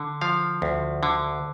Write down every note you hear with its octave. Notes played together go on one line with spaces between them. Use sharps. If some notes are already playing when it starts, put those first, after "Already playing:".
Already playing: D3
F3 F5
D2
D3